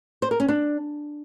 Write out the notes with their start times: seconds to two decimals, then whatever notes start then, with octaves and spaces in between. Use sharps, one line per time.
0.22 C5
0.31 A#4
0.40 C#4
0.48 D4